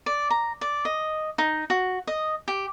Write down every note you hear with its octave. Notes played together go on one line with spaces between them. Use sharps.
D5
A#5
D5
D#5
D#4
F#4
D#5
G4